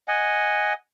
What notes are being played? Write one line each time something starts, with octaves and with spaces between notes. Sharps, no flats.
D#5 F#5 G#5